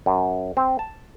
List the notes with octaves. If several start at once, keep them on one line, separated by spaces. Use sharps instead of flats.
F#2
C4
A5